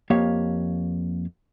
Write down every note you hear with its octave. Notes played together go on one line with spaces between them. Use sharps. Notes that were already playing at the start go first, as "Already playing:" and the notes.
F2 A#3 G4 C#5 F5